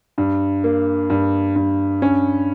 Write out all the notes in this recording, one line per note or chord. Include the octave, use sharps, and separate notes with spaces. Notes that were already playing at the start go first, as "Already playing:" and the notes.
G2
A#3
G2
G2
C#4